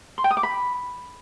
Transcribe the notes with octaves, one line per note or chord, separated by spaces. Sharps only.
C6
G5
D#6
D6
B5